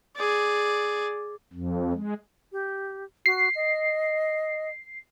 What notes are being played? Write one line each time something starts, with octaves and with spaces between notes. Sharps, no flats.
G#4 D5
F2
G#3
G4
F#4 C7
D#5